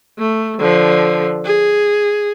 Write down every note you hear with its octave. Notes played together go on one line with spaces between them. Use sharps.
A3
D3 F3
G#4